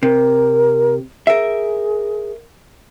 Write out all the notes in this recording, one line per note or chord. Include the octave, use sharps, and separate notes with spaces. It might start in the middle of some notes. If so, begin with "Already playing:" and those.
C3 A#4
G#4 A#4 E5